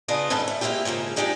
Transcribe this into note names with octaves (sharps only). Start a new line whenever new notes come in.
C#3 B3 D4 F4 D#5
G#2 D#3 A4 B4 A5
A3
G#3 A#3 D4 E4 F4 G4
G#2 C#3 F3 A#3
F3 G#3 D#4 G4 G#4 D5